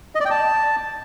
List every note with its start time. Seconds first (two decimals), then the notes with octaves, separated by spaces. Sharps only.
0.15 D#5
0.20 D5
0.25 G5
0.30 A5